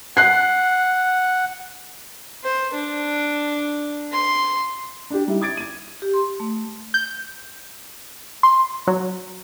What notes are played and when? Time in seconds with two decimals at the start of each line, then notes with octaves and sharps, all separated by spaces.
0.17 F#5 F#6 C7
2.44 C5
2.74 D4
4.12 C6
5.10 D4 G4
5.27 G3 D#4 E4
5.41 D6 D#6 G#6 A6 D7
5.57 G#6 D#7
6.02 G4
6.14 C6
6.40 A3
6.94 G6
8.43 C6
8.87 F#3